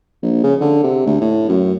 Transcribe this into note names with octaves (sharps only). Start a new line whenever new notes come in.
A#1
C#3
D3
C3
D2
A2
F#2